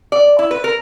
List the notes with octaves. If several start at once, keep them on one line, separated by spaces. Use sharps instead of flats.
D5
E4
B4
A#4